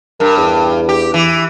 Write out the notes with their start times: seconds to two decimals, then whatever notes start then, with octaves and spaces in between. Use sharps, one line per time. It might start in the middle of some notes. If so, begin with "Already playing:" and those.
0.20 G2 A#4
0.37 E2
0.89 G4
1.14 E3